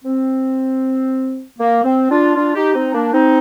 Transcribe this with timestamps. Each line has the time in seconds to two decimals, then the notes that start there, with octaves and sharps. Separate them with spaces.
0.04 C4
1.59 A#3
1.84 C4
2.10 D4 F4
2.35 D4 F4
2.55 D#4 G4
2.74 C4 D#4
2.94 A#3 D4
3.12 C4 D#4